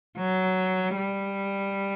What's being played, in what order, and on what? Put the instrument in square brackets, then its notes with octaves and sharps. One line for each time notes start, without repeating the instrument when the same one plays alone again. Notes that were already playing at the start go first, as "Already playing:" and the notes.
[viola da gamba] F#3
G3